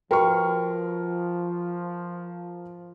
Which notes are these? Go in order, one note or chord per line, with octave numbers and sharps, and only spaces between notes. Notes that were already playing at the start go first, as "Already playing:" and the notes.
F3 F#4 A#4 B4 G5 C#6